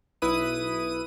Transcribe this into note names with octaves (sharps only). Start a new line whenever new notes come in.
B1 E4 B4 D#6 D#7